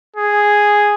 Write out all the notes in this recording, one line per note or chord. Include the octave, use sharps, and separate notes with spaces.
G#4